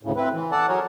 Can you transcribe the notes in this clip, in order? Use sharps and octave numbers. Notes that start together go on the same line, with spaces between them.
D2 A2 C#3
C4 E4 B4
E3
A4 D5 F#5 A5
F#3 G#4 A#4 C#5